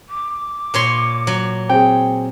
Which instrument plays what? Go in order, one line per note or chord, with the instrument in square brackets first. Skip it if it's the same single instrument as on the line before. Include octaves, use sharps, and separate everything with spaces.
[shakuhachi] D6
[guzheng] A#2 C#5 C6
F#3
[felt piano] C4 G#4 [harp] G5